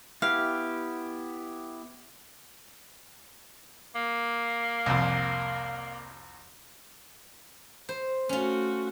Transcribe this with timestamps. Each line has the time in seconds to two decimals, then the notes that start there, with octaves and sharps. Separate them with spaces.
0.22 B3 E4 G4 F5
3.95 A#3
4.86 C2 F2
7.89 C5
8.29 A3 C#4 F4 F#4